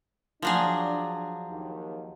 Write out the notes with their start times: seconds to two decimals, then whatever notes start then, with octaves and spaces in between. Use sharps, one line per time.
0.42 F3 F#3 D4 G#4
1.48 D#2